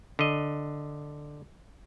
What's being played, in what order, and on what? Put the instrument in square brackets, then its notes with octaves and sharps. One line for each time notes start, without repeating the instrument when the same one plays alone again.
[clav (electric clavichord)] D3 D#5